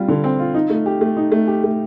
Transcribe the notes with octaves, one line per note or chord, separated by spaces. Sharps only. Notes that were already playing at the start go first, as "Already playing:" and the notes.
Already playing: G3 C4 F4
D3
C4
F4
D#4
A3
G4
A3
D#4
A3
G4
A3